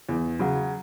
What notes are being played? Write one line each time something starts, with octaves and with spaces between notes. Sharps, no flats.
E2
C#3 F#3